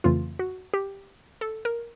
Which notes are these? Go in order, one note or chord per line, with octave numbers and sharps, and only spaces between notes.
F2 C#3 E3 A3 F4
F#4
G4
A4
A#4